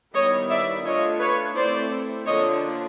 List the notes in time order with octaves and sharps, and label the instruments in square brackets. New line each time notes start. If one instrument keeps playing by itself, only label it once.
[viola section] D#3 G3 B3 E4 C#5 D#5
D5 E5
A3 D4 F4 C#5 D#5
B4 C#5
A3 C4 E4 C5 D5
D3 F3 A#3 D4 F4 C#5 D#5